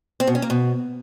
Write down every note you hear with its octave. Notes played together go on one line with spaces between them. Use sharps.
C4
B2
C#4
A#3
B2